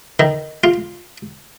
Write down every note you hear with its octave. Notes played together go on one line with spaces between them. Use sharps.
D#3
F4